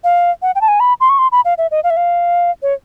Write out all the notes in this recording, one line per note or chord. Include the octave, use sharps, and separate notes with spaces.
F5
F#5
G5
A5
G#5
B5
C6
C#6
C6
B5
F5
E5
D#5
F5
E5
F5
C#5